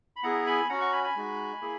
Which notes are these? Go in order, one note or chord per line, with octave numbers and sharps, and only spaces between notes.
B5
B3 E4 G#4 F#5 A#5
G#5 B5
C#4 F#4 F#5 A#5
A#5 C#6
G#5 B5
G#5 B5
G#3 D#4 F#4
A#3 E4 G#4